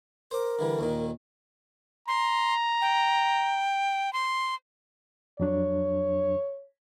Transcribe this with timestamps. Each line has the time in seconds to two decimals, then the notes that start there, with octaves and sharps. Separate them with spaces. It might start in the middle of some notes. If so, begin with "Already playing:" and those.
0.31 A#4 C5 D6
0.59 D3 E3 G3
0.79 D#2 A#2 D#3
2.08 A#5 C6
2.82 G5
4.13 C6
5.40 F2 F#3 D4 C#5